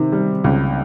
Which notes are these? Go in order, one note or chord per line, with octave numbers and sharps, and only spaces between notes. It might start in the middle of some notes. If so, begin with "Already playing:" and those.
Already playing: C3 D#3
G3
C#2